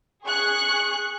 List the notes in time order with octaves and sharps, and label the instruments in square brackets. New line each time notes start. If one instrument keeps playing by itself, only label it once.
[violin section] G#4 C#6 F#6